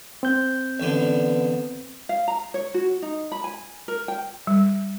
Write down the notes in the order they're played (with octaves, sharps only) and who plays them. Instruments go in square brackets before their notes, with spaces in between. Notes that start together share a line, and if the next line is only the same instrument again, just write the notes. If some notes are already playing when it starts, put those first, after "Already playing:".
[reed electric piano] C4 G6
[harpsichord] A1 D3 [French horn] B3
[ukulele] F5
A#5
C#5
F#4
D#4
B5
G#5
A#4
G5
[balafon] G3